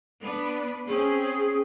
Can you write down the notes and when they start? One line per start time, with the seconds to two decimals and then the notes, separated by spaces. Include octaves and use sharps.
0.22 B3 D4 B4
0.87 C4 C#4 G#4